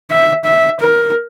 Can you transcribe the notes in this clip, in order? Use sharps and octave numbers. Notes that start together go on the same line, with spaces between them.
E5
E5
A#4